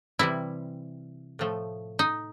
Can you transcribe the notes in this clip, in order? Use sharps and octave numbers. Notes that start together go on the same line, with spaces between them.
C3 E3 G3 E4
A2 F3 A3
D#4